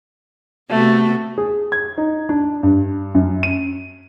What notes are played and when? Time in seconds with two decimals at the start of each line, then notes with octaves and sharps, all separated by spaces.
0.71 C3 A3 B3 F#4
1.38 G#4
1.72 G#6
1.98 D#4
2.29 D4
2.63 G2
3.15 F#2
3.43 D#7